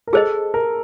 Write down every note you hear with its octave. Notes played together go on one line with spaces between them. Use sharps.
A#4
G#4 A4 C5 D#5
A#4